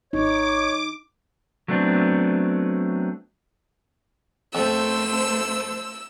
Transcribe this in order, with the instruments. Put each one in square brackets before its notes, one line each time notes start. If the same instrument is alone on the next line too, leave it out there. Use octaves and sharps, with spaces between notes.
[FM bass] G#1 [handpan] D#4 [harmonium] C#5 [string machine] D6
[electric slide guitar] F#3 A3 B3 C4 D4
[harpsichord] F2 [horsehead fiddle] A3 C5 [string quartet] E6